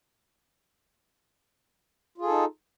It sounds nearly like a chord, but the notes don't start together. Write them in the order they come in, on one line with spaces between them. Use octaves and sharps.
F4 G#4 A4 D#4